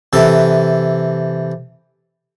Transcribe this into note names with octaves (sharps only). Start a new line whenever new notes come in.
C3 E3 A4